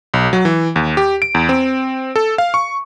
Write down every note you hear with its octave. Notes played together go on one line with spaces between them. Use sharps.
B1
F#3
E3
D#2
G4
D7
E2
C4
A4
F5
C#6